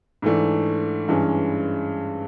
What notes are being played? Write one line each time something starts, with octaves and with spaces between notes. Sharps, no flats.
G#2 E3 A3 D4
G2 E3 G#3 C#4